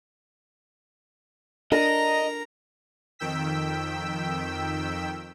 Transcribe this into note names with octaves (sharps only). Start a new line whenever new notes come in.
D4 A#4 D#5 A#5
F2 D#3 G5 E6 B6